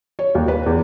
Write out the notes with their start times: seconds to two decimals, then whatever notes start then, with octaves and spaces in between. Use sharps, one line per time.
0.19 C#5
0.35 D#2
0.48 B4
0.66 E2